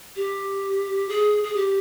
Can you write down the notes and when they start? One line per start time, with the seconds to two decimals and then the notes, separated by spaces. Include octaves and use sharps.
0.16 G4
1.09 G#4
1.44 G#4
1.56 G4